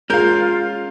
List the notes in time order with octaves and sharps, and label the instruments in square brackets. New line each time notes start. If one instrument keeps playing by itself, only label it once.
[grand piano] G#3 [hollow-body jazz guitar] C#4 A#4 [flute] F4 [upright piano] F5 G6